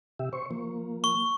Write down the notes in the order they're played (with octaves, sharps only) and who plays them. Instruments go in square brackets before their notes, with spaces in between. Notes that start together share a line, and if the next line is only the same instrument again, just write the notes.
[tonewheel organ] C3 G4 E5
C5 C#6
F3 A#3
[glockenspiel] C#6